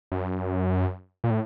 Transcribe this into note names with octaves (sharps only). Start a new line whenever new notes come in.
F#2
A#2
A2